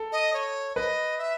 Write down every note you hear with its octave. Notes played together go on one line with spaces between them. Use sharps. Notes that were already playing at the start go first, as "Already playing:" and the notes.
Already playing: A4
D#5
C#5
B4 D#5
E5